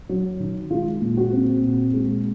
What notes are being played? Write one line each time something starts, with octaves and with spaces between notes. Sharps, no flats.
F#3
D#3
G#3 F4
A#2
F#4
C4
A#2
G#3